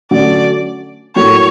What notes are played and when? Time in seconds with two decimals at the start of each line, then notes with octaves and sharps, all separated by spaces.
0.11 D3 F#3 A3 C#4 D5
1.16 A2 F#3 A#3 C#5